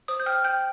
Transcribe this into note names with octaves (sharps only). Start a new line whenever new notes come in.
C5 D#6
G6
G5 F6
G5 G6